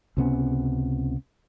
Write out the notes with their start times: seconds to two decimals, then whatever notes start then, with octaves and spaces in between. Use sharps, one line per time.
0.17 C#2 C3 B3 C#4